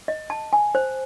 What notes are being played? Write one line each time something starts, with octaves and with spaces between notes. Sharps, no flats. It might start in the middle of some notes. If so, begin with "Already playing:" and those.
D#5
A5
G#5
C5